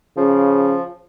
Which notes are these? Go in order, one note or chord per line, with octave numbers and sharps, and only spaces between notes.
C#3 F3